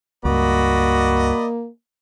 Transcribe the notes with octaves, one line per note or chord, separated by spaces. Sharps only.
C#2 G2 A#3 F#4 D5 D#5 B5